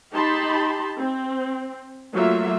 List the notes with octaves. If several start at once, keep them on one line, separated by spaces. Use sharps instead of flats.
D#4 G4 A5 B5 C6
C4
F#3 A3 A#3 F4 E5